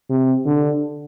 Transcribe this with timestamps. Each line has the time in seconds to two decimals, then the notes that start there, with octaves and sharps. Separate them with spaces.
0.10 C3
0.45 D3